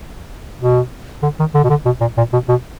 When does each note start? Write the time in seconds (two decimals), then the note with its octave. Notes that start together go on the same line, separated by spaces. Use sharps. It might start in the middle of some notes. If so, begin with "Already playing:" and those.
0.61 B2
1.23 D3
1.40 D#3
1.54 D3
1.64 B2
1.70 D3
1.86 B2
2.01 A#2
2.17 A#2
2.33 B2
2.49 B2